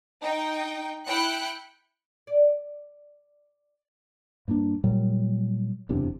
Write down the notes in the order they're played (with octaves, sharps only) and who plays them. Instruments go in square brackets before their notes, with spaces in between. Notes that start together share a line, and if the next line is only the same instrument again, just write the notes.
[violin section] D#4 G5
E4 G5 F#6 C#7
[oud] D5
[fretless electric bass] G2 A#3 D4
A#2 F#3 G3
F#1 E2 C3 D4